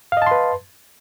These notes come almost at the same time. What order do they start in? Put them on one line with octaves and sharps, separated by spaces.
F5 D#5 A5 C6 B4